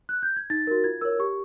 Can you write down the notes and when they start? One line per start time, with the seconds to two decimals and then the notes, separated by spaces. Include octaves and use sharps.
0.09 F#6
0.23 G6
0.36 G#6
0.50 D#4 A6
0.67 F#4 A#4
0.84 F4 G#6
1.01 A#4 C#5 E6
1.19 G4 C#6